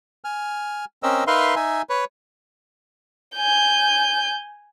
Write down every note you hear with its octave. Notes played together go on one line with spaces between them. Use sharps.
G#5 F6
C4 C#4 A#4 D#5 E6
D#4 A#4 B4 E5 F5 C6
D#4 E5 G#5
B4 C#5
G#5 G6